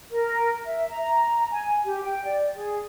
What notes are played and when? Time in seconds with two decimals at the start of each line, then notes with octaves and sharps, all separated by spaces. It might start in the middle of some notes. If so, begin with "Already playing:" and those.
0.11 A#4
0.64 E5
0.89 A#5
1.51 G#5
1.84 G4
2.02 G5
2.25 D5
2.54 G#4